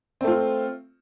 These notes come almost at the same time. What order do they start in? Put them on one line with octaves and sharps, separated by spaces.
C4 A3 F4